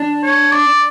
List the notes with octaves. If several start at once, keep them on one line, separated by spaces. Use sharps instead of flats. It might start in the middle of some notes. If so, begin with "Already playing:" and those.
Already playing: D4
C#5
D5